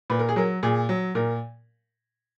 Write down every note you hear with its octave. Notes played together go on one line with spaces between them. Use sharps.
A#2 B4
A#4
G#4
F#3 A#4
A#2 G#4
F#3
A#2 A#4